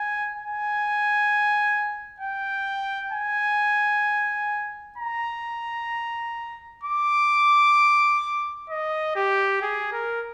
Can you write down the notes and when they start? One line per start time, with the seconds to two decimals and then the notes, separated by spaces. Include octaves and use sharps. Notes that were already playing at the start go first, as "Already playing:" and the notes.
Already playing: G#5
0.35 G#5
2.20 G5
3.12 G#5
4.97 A#5
6.83 D6
8.70 D#5
9.16 G4
9.62 G#4
9.93 A#4